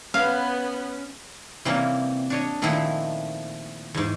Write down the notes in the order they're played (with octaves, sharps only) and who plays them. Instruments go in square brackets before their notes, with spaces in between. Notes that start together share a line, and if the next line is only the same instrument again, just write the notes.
[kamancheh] B3 B4 [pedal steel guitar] C#4 [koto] F5
[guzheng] C3 E3 G3 A#3 C4 C#4
D4 C#5 D#5
A#2 D#3 F3 A3 E4 F#4
E2 G#2